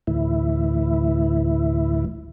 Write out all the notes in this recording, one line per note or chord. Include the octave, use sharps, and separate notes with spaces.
D2 A2 E3 E4